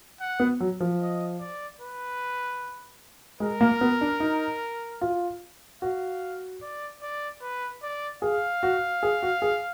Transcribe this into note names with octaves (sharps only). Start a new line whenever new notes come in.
F#5
B3
F#3
F3
D#5
D5
B4
G#3 A#4
A#3
B3
D4
D#4
F4
F#4 F5
D5
D5
B4
D5
G#4 F5
F#4
G#4
F#4
G#4